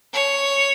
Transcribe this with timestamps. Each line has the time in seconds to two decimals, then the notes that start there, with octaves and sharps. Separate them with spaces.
0.13 C#5